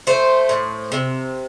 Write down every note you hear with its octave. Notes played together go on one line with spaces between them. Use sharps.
A3 C5
A2
C3